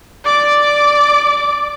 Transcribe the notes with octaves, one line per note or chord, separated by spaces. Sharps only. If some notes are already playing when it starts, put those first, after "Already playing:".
D5 D6